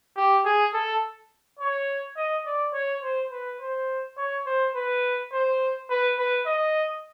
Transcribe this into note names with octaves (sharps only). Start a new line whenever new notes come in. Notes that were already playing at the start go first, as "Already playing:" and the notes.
G4
G#4
A4
C#5
D#5
D5
C#5
C5
B4
C5
C#5
C5
B4
C5
B4
B4
D#5